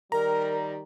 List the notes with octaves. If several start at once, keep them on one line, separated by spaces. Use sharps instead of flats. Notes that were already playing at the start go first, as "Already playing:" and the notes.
D#3 G3 A#4 A#5